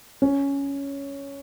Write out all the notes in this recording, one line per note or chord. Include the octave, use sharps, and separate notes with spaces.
C#4